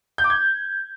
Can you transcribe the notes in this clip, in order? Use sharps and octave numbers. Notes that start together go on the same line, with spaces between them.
G6
D6
G#6